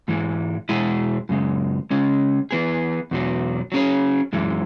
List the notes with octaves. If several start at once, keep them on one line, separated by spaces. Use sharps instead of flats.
G#2 E3 G#3
E2 B2 G#3 E4 G#4
F#2 C#3 G#3
C#3 G#3 C#4
E3 B3 G#4
E2 B2 F#3
F#3 C#4 G#4 C#5
F#2 E3 G#3